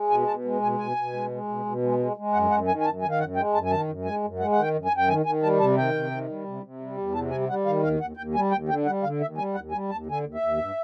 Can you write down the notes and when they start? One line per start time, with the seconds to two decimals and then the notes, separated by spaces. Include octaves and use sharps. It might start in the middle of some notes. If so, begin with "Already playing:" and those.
Already playing: G#3
0.10 B2 G#5
0.27 B2 A5
0.44 G#3
0.62 B2 G#5
0.79 B2 G#5
0.97 B2
1.13 G#3
1.31 G#3
1.48 B2
1.65 B2
1.82 G#3
1.99 G#3
2.17 G#3
2.33 F#2 F#5
2.50 F#2 F#5
2.68 D#3 G#5
2.81 G#5
2.85 F#2 A5
3.02 D#3 G#5
3.11 F5
3.20 F#2 F#5
3.36 G#3 G5
3.54 F#2 A5
3.65 G#5
3.70 D#3 A5
3.88 F#2
4.05 G#3 G#5
4.23 F#2
4.39 G#3 F#5
4.52 D#3 F#5
4.62 G5
4.74 F#2
4.85 G#5
4.92 F#2
4.98 G5
5.08 D#3 G#5
5.26 D#3 G#5
5.42 G3 A5
5.60 C3 A5
5.77 D#3 G5
5.94 C3
6.11 D#3
6.29 G3
6.46 C3
6.63 C3
6.81 G3
6.97 E2
7.14 C3 A5
7.31 G3 G#5
7.49 G3 F#5
7.66 D#3 F5
7.83 D#2 F5
8.00 D#2 F#5
8.17 D#2 G5
8.34 G3 G#5
8.51 D#2 G5
8.69 D3 G5
8.86 G3 F#5
9.03 D3 F5
9.21 D#2 E5
9.38 G3 G#5
9.54 D#2 F#5
9.71 G3 G#5
9.89 D#2 A5
10.06 D3
10.12 G#5
10.23 D#2
10.34 E5
10.40 D#2
10.58 G2